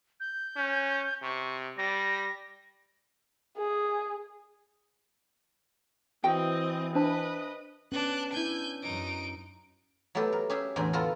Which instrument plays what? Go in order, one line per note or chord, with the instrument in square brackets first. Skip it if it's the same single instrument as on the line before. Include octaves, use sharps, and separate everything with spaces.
[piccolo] G6
[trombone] C#4
[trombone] C3 [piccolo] C#6
[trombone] G3 [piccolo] A#6
[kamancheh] G#4
[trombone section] E3 [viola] C4 D#5 [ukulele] F#4 G5
[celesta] D4 C5 A5 [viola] B4 D#5
[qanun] B3 [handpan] C#4 [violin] D4 F#6
[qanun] D4 E4 [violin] G#5 G6
[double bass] F#2 [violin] D#4 D7
[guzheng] F#3 A3 B3 G4 A4
A#4
C#4 G4 G#4 E5
E2 A2 D3 C4 A#4 G#5
B3 F4 F#4 A4 A#4